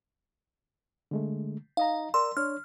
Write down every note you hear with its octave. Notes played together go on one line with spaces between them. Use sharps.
D3 G#3 A3
D#4 D#5 F5 A#5
A#4 D5 C6 E6
D4 C#5 F6